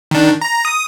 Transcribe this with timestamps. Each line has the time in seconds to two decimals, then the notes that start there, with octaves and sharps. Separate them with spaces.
0.11 D#3 D4
0.41 A#5
0.65 D#6